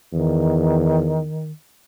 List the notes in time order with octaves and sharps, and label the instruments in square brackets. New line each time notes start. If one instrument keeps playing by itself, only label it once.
[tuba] E2 [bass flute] D#3